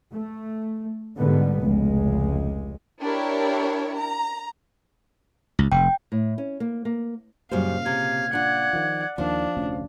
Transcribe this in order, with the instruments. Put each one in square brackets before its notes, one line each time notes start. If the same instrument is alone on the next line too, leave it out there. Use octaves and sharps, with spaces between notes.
[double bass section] A3
G#2 D3 G3 B3
F1 C#2 G#3
[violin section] D4 E4 G4 A#4 C#5
A#5
[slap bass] C#2
[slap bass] F1 [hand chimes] G5
[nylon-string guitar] A2
C#4
A#3
A#3
[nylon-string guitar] F#2 G3 C5 [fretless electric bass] A#2 C#3 [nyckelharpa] F5
[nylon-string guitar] C3 [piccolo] G#6
[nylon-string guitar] D4 F4 [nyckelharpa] D5 F#5
[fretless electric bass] D#3 F3
[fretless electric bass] D#2 D#3 [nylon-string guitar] F3 [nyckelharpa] D4 [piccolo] F5
[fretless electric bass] F1 D2 C#4